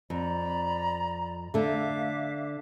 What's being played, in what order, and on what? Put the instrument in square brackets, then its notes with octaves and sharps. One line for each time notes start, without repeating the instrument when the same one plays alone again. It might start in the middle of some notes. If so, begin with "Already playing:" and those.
[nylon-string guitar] F2 [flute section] D5 A#5 B5
[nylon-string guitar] D3 A3 [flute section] E5 F5 D6